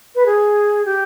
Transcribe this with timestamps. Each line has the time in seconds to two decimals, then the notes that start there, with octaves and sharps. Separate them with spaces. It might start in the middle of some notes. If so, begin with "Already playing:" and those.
0.15 B4
0.26 G#4
0.85 G4